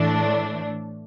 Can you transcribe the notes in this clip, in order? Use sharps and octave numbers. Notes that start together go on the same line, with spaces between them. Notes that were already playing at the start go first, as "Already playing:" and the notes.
Already playing: A2 E3 A3 D4